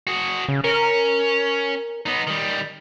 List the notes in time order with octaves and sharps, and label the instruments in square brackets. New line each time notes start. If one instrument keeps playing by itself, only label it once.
[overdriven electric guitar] F#4 G#4
[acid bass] C#3
[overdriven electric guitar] C#4 [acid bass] A#4
[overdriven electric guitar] B3 D#4
D#3 G3